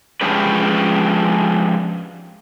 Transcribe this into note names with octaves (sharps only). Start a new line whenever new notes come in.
F3 G#3 C#4 D4 G4 B4